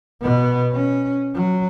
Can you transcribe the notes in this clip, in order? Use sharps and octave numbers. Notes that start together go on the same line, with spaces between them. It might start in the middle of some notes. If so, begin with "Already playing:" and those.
B2 B3
C#4
F#3